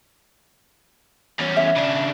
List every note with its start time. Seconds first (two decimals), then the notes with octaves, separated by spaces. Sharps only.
1.39 E2 C#4
1.57 E5
1.76 C#3 D4